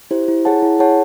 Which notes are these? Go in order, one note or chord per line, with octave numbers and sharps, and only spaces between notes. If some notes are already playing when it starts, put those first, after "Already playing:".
E4 G4 C5
E4
G#4 C#5 F#5 A5
E4
G#4 C#5 F#5 A5